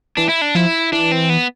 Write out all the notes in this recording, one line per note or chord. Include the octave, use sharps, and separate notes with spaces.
E3 D4
E4
D4
F3 E4
E3 D4
C4
B3